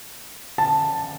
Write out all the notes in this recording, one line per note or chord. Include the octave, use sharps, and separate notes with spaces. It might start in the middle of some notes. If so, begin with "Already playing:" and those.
A5